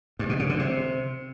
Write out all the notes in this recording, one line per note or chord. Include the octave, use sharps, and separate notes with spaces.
G2
B2
C#3
D3
C3